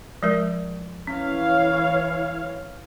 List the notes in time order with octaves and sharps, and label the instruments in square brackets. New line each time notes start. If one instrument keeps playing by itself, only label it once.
[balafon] F3 G#3 A#4
[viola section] E3 C#5 F5 [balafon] C#4